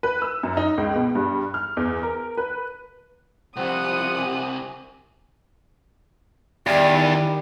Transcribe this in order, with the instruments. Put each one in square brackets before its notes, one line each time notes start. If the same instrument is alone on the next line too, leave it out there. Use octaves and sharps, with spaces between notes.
[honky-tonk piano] B4
E6
F#2
D#4
C#2
B2
G2
F6
E2
A#4
B4
[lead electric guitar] C2 C3 [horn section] F3 F#5 [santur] C4 [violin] D#6
[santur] G4 G#5
[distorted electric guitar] E2 [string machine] D#3 [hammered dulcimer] G3 [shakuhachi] D5